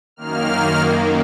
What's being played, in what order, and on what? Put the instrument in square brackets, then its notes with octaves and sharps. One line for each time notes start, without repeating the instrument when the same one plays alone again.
[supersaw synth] F#2 D#3 A#3 F6